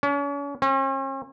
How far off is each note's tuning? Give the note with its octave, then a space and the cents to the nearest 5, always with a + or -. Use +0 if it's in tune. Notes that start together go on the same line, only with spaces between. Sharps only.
C#4 +40
C#4 -45